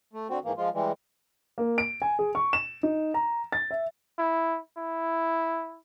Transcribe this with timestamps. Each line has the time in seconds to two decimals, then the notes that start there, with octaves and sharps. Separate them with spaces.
0.13 A3
0.30 D3 C4 F#4
0.44 G#2 D#3 E3 A#3
0.57 F3 G#3 F4
0.74 E3 G3 G#3
1.58 A#3
1.78 D7
2.02 G#5
2.19 G#4
2.35 C#6
2.53 E7
2.83 D#4
3.14 A#5
3.52 A6
3.71 E5
4.18 E4
4.77 E4